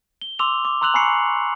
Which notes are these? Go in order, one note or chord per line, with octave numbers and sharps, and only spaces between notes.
G7
C6 D6 E6 F7
D6
A#5 C6 E6 F#6 F7 F#7
G#5 A#5 B5 C#6 C7 C#7